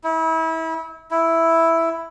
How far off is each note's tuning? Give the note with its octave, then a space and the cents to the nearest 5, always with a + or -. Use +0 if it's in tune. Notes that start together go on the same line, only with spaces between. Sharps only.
E4 -30
E4 +0